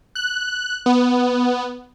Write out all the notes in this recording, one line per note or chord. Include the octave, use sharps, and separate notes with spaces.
F#6
B3